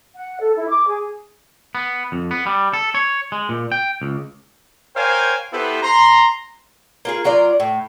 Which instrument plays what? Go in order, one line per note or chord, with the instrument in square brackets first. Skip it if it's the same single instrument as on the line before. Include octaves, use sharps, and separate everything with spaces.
[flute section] F#5
A4
E4
D6
G#4
[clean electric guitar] B3
F2
B3
G3
A4
C#5
G#3
A#2
G5
C#2
[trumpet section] A#4 C5 C#5 F5 G5 G#5
B3 E4 G4 A4 B4 C5
A#5 C6
[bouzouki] A#3 F4 G#4
F#3 F4 A#4 D5
A2